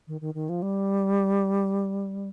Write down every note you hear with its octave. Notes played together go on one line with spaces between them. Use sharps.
D#3
D#3
D#3
F3
G3